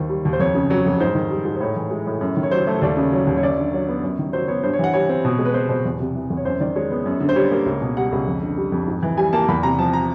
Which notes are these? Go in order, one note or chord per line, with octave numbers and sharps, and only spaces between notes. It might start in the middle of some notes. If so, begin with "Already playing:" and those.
Already playing: D#2 D#3 C5
G3
D#2
C5
F2 C#5
C#3
F#3
F2
G#2 C5
D#3
G3
G#2
C5
A2 C#5
E3
G#3
A2
F#2
D#3
C#5
F#3 C5
A3 C#5
D#2 D5
C#3
F#3
D#2
C#5
F#2 D5
D3
F#3 C#5
B3
F#2
D#3
F#3 C5
B3 C#5
G2 C5
C#5
E3 F#5
G3 C#5
C4
B2
G#3
B4
C4 C5
B2 C5
E2
C3
E3
E2
C#5
F#2 C5
D#3 D5
G#3 C#5
B3
F#2
D3
C5
G3 C#5
A#3
C#2
B2
G3 F#5
C#2
F2
D3
G3
F2
G#2
E3
G3 G#5
A#3 A5
E2 B5
C3 A#5
F3 A5
A#5